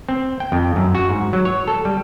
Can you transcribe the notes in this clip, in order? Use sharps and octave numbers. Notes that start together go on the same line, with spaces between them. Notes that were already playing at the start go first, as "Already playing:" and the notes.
C4
G5
F2
F#2
F#4
G#2
F#3
C#5
A4
G3